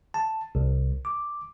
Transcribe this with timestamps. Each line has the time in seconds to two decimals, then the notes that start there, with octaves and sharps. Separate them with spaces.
0.14 A5
0.55 C2
1.05 D6